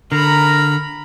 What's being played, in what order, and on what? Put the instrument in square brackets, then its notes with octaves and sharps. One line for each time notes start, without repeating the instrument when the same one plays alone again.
[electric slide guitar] D3 [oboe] A#4 [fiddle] A#5 B5